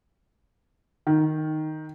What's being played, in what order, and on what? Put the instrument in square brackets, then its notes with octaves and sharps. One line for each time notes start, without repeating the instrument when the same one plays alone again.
[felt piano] D#3